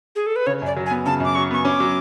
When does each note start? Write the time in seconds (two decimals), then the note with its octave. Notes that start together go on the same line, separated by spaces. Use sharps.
0.16 G#4
0.26 A4
0.36 B4
0.47 C#3 C#5
0.62 F#2 D5
0.77 F#3
0.86 G#5
0.91 B3
1.06 C#3 A5
1.20 F#2 D6
1.35 F#3 C#6
1.51 B3 C#6
1.65 C#4 D6
1.80 F#3